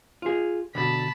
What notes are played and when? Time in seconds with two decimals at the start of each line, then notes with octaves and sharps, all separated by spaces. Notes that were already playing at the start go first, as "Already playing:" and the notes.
0.22 F4 G#4
0.75 B2 D3 A5 B5